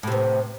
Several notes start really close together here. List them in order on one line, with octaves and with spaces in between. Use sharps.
A2 C3 B3